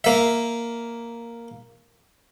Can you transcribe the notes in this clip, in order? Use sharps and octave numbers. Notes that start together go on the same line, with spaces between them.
A#3 E5